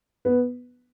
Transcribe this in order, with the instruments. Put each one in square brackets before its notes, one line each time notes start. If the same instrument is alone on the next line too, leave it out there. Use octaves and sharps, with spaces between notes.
[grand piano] B3 B4